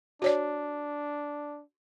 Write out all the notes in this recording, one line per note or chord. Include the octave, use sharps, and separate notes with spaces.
D4 F#4 C#5 D5